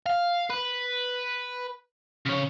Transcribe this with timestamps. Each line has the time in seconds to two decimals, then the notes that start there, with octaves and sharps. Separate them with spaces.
0.06 F5
0.50 B4
2.26 C#3 C#5